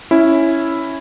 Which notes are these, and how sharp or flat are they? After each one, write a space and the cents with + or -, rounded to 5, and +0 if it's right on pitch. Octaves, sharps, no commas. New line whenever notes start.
C#4 +0 E4 +0